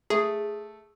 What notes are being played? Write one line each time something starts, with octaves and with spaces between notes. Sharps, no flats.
A3 G#4